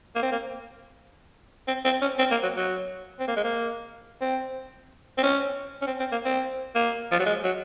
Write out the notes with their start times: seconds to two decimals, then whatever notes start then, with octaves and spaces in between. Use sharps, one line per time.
0.15 A#3
0.22 C4
0.32 A#3
1.67 C4
1.85 C4
2.01 C#4
2.18 C4
2.31 A#3
2.43 F#3
2.56 F#3
3.19 C4
3.27 A#3
3.36 G#3
3.44 A#3
4.21 C4
5.18 C4
5.23 C#4
5.82 C#4
5.87 C4
6.00 C4
6.12 A#3
6.25 C4
6.75 A#3
7.11 F3
7.19 F#3
7.25 G#3
7.44 F#3